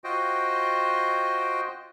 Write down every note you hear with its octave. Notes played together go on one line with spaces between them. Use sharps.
F4 F#4 C5 D#5 G5